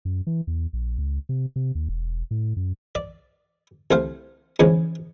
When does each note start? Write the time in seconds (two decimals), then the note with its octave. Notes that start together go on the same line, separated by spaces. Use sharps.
0.05 F#2
0.27 E3
0.47 E2
0.73 A#1
0.98 C#2
1.29 C3
1.56 C3
1.75 D#2
1.89 E1
2.31 A2
2.56 F#2
2.95 D5
3.91 C2 A3 C5 F5
4.60 E2 C#3 F3 G#3